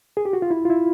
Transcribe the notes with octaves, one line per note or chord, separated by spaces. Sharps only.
G#4
G4
F#4
F4
E4
F4
E4